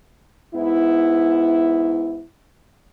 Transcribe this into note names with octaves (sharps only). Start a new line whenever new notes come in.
G#2 B3 E4